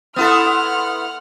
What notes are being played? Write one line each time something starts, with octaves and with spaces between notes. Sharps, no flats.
B3 E4 A4 F#5 C6 F6